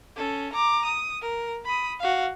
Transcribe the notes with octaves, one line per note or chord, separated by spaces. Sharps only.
C#4 A4
A#5 D6
D#6
A#4
B5 D#6
F#4 F5